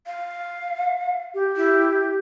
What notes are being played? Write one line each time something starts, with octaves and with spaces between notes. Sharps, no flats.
F5
G4
E4